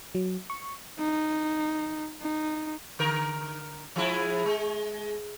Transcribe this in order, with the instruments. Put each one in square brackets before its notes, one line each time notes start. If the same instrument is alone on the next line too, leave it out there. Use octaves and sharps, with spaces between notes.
[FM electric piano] F#3
C#6
[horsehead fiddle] D#4
D#4
[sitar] D3 A#4
F3 G#3 E4
G#3